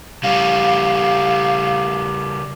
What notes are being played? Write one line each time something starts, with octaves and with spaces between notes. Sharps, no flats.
C#3 G3 F5